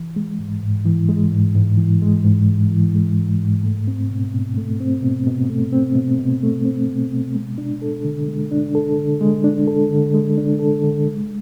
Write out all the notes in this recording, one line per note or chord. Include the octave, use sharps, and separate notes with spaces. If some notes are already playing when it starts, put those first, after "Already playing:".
Already playing: E3
G#3
G#2
G#2
E3
G#3
G#2
G#2
E3
G#3
G#2
G#2
E3
G#3
G#2
G#2
A3
C4
B2
B2
A3
C4
B2
B2
A3
C4
B2
B2
A3
C4
B2
B2
G#3
D4
A4
D3
G#3
D4
A4
D3
G#3
D4
A4
D3
G#3
D4
A4
D3
G#3